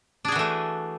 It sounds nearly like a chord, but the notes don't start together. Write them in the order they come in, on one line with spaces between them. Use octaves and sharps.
D4 G#4 F#4 E3 A3